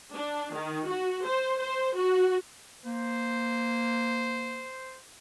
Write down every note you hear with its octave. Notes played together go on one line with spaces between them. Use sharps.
D4
D#3
F#4
C5
C5
F#4
A#3 C5